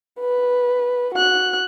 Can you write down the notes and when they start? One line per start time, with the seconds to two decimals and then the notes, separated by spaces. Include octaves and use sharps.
0.20 B4
1.14 F#4 F#6